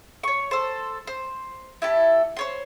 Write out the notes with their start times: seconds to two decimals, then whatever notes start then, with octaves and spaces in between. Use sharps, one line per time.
0.23 C#5 C#6
0.51 A4 C5
1.07 C5
1.82 E4 G4 A4
2.37 C5 C#5 C6